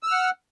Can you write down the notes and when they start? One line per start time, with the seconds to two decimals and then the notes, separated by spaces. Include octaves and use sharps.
0.03 E6
0.07 F6
0.11 F#5